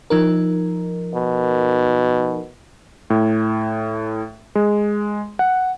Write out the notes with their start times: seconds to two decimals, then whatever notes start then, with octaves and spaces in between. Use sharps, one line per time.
0.10 F3 D#4 A#4
1.14 B2
3.10 A2
4.55 G#3
5.39 F#5